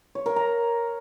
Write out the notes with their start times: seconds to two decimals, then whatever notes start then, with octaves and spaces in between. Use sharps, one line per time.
0.15 C#5
0.26 A#4
0.36 A#5